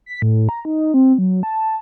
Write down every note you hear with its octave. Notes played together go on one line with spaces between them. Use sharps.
B6
A2
A#5
D#4
C4
F#3
A5